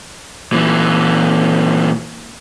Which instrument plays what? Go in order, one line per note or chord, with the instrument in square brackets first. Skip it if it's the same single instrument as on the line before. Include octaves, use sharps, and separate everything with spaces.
[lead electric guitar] A#2 E3